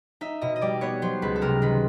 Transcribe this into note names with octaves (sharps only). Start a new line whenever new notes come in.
D#4 E5
B2 D#5
D#5
G3 D5
B3 C#5
F#3 C5
C#2 B4
A4
C3 A#4
D#3 B4